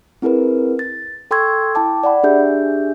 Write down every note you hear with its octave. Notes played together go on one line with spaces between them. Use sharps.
C4 E4 G#4 A#4 B4
A6
A4 G5 C6 C#6 E6 G#6
E4 G5 A5 D6
D5 F#5 B5
D4 G4 G#4 E5 G6